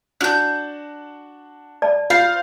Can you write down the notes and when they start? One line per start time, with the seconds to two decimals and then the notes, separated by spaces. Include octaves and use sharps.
0.21 D4 F#4 A5 F#6 G6
1.82 D5 A5
2.10 F4 C5 F5 A6